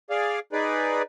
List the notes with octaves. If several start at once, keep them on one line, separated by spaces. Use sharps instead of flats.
G#4 D5 F5
D#4 G#4 B4 D5